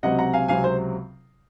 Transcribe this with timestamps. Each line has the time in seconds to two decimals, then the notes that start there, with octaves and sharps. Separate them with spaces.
0.03 C#2 C3 F#3 C4 D#5 F#5
0.19 F#5 A#5
0.33 F5 G#5
0.48 C#2 C3 F#3 C4 F5 G#5
0.64 C5